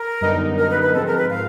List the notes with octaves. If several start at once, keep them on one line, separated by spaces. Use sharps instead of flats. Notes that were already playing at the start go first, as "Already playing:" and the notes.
Already playing: A#4
F#2 D3 G3 B3 D#4
A#4
B4
B4
G#2 F3 G#3 C4 A4
A#4
B4
F5